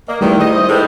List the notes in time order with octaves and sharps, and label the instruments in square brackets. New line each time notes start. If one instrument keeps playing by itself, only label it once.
[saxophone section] A#3 [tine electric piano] D5 D#5
[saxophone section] E2 D#3 [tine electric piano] G3 A3 E4
[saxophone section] D#5
[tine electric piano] C5 E5
[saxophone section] G#2 G3 [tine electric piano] E4 A4 B4